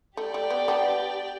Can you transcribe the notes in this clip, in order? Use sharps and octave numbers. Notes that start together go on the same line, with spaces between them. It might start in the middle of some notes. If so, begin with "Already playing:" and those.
A3 G4 D5 G5
A3
B3
B3 D4